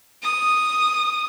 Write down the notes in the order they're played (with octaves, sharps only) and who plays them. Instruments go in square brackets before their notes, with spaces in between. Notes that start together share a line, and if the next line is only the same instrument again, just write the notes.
[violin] D#6